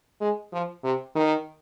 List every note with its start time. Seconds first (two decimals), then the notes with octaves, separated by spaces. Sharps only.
0.21 G#3
0.52 F3
0.83 C3
1.15 D#3